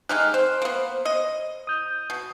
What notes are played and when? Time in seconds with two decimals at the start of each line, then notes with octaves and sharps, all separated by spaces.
0.09 G#3 D#4 G4 D#5 F6 F#6
0.34 C4 C5
0.62 A#3 B3
1.05 D#5
1.67 D#6 G6
2.10 B2